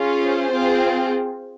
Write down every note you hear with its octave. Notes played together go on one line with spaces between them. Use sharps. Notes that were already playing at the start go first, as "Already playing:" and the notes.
Already playing: C#4 F4 G#4
C5
C4 F4 G#4